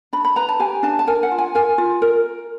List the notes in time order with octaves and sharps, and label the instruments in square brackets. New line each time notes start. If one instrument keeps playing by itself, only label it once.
[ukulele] D4 B5
B5
B4 A#5
A5
G4 G#5
D4 A5
A5
A#4 G#5
F#5
F4
G#5
A#4 G#5
F4
A#4